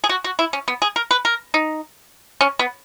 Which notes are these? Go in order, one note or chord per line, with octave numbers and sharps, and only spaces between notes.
G#4
F#4
F#4
E4
C#4
B3
G#4
A#4
B4
A#4
D#4
C#4
B3